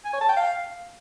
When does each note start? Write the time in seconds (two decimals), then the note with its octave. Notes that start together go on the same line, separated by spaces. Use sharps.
0.05 G#5
0.13 C#5
0.21 A5
0.29 G5
0.37 F5